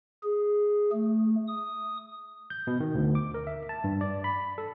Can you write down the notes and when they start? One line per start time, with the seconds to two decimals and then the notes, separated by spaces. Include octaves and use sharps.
0.23 G#4
0.93 A3
1.48 D#6
2.50 G6
2.67 B2
2.80 D#3
2.95 D2
3.15 D6
3.34 A#4
3.47 E5
3.69 A5
3.84 G2
4.01 D5
4.24 B5
4.58 A4